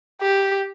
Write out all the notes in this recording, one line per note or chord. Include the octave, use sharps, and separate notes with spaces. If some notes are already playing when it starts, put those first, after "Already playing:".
G4